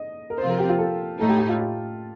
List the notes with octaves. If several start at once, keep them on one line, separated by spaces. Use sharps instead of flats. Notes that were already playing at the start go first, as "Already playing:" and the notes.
Already playing: D#5
A#4
C3 F3 C4 F4 C5
A#4
G4
F4
A4
A2 A3 D#4 A4
G4
G4
F4
G4